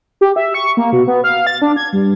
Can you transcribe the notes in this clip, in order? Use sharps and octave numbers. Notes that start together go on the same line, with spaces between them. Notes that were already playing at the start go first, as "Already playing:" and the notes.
G4
E5
C#6
A#3
B2
B3
F5
A6
D4
G#6
G2